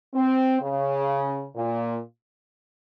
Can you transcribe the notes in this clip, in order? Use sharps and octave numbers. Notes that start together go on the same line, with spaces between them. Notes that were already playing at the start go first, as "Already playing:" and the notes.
C4
C#3
A#2